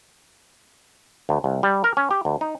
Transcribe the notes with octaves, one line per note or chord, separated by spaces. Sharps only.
D2
C2
G3
A#4
C#4
G4
D2
D#4